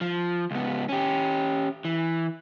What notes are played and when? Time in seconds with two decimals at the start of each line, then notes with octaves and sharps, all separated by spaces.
0.01 F3
0.51 C#2 B3
0.89 C#4 G4
1.85 E3